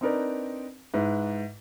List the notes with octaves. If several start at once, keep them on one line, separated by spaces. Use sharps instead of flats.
C4 D4 D#4 A#4 B4 D5
G#2 E4 B4